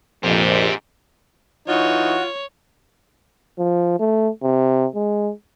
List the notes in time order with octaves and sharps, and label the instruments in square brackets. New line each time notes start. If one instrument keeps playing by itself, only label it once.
[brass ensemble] A#1 F2 [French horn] G#2 [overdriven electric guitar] C4 G4
[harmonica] E3 D#4 [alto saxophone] F4 [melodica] F#4 [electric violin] C#5
[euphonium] F3
A3
C3
G#3